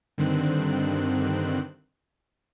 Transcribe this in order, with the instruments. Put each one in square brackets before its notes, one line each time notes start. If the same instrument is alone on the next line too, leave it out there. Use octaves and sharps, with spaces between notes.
[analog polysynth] G2 D3 D#3 C4 F#6